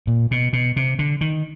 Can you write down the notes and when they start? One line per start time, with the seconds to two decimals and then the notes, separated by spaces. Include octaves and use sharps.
0.07 A#2
0.31 B2
0.53 B2
0.76 C3
0.99 D3
1.21 D#3